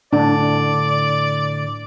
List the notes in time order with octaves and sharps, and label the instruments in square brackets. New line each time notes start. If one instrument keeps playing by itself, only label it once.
[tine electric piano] A2 D3 [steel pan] D4 [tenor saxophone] D5